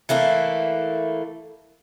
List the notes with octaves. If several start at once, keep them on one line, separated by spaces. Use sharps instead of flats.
E3 A3 A#3 E4